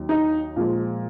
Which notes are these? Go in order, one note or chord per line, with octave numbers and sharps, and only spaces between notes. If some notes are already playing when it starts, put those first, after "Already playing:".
Already playing: D#2 D#3 F#3
D#4
A#2 F3 G#3